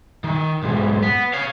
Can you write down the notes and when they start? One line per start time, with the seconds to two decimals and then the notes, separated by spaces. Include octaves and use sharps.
0.24 D#3
0.63 B1 G#2
1.03 B3
1.33 C#5 F5